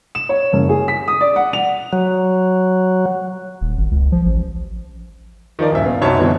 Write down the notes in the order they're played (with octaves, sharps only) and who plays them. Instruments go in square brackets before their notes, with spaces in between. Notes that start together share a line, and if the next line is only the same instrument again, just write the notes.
[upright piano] E7
C#5
F#1
G#4
B6
D#6
D5
F#5
F7
[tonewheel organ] F#3
[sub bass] D#1
G#1
C#2
F3
A1
[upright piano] D#3 F3 A#4 D5
D#1 G2 E5
B3 F5
C2 F#2 D#4 C#5 A5
B2 D3 E3 G3 C4